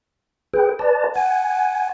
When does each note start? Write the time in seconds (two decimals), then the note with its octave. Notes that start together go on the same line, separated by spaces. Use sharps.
0.54 G#4 B4 G5
0.79 B4 D5 A5
1.16 F#5 G#5